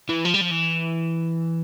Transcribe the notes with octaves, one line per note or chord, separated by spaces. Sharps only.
E3
F3
G3
F3
E3